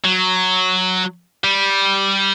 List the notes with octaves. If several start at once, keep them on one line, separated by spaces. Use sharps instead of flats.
F#3
G3